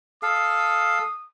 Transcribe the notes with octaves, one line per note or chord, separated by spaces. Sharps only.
A4 F5 D#6